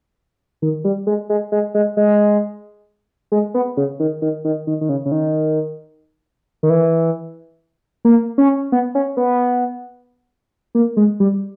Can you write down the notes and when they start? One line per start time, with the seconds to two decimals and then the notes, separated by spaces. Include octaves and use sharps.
0.62 D#3
0.84 G3
1.07 G#3
1.30 G#3
1.52 G#3
1.74 G#3
1.97 G#3
3.32 G#3
3.54 B3
3.77 C#3
4.00 D#3
4.22 D#3
4.45 D#3
4.67 D#3
4.81 D#3
4.89 C#3
5.05 C#3
5.12 D#3
6.63 D#3
6.70 E3
8.05 A#3
8.38 C#4
8.72 B3
8.95 C#4
9.17 B3
10.75 A#3
10.97 G#3
11.20 G3